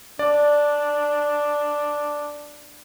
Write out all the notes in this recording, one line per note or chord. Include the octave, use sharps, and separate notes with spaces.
D4 D5